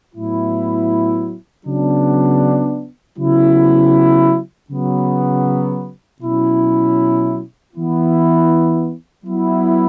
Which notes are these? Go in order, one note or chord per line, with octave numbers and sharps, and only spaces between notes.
A2 F#3 B3 E4
C#3 F#3 B3 D4
C#3 F#3 B3 E4
C#3 F#3 B3
B2 F#3 C#4 E4
E3 B3 E4
F#3 B3 E4